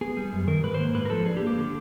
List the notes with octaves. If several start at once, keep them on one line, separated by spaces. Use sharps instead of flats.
B3 G#4
G3
F#2
D#3 A#4
G#2 B4
C5
A#3
G#2 B4
A#4
F3 A4
D4 G#4
G4
A#3
G4
D3